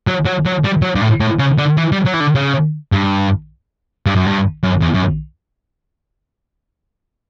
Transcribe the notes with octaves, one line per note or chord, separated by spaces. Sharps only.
F#3
F#3
F#3
G3
F#3
G2
A2
A2
C#3
D3
E3
G3
F#3
E3
D3
C#3
G2
G2
F#2
G2
F#2
E2
F#2